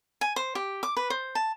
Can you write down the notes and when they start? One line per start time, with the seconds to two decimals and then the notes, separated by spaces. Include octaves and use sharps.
0.21 G#5
0.36 C5
0.55 G4
0.83 D6
0.97 B4
1.10 C5
1.35 A5